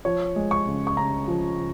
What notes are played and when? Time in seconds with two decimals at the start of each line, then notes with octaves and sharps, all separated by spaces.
0.05 F3 C#5
0.36 G#3
0.51 C#6
0.66 C#3
0.87 C#6
0.97 C#3 A#5
1.28 F3